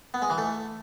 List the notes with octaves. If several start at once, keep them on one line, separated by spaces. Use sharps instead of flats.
B3
G#3
E3
A3